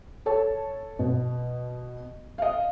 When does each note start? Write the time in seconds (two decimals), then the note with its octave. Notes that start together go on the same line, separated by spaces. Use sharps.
0.26 A4 C#5 A5
0.99 B2
2.38 D#5 F5